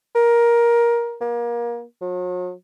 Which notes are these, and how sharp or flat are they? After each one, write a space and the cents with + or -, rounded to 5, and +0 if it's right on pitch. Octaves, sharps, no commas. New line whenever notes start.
A#4 +15
A#3 +30
F#3 -40